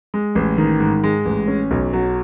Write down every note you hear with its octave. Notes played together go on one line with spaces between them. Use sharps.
G#3
A1
D#3
G#2
G#3
A1
C#4
B1
F#3